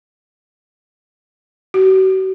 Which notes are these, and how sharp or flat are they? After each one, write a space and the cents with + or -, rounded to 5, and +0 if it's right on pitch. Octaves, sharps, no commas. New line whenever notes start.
F#4 +40